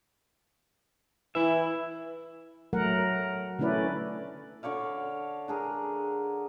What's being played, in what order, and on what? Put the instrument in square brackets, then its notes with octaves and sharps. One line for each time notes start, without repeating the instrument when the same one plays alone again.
[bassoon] E3 [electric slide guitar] E4 E5
[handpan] F#3 A3 A#4 F#5
D3 A3 C#4 E4 B4 D5
[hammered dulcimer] D3 C#5 D5 F5
D4 G#4 A#4